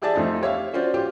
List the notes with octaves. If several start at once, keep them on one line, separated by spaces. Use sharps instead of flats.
E4 G4 G#4 D5 E5 A5
F2 F3 A3 D#4
G4 C#5 E5 F5
C#4 F4 F#4 C5 D5
F4 G4